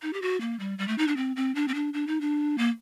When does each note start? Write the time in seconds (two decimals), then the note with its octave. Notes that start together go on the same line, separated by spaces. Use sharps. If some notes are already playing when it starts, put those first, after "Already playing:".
0.02 D#4
0.13 G4
0.22 F#4
0.41 A#3
0.60 G3
0.78 G3
0.88 A3
0.98 D#4
1.08 D4
1.17 C4
1.36 C4
1.55 D4
1.68 C4
1.74 D4
1.94 D4
2.07 D#4
2.21 D4
2.58 A#3